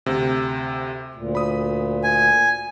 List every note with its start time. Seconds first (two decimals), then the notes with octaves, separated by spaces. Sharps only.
0.06 D2 C3
1.15 D2 A#2
1.35 B5 D#6
2.03 G#5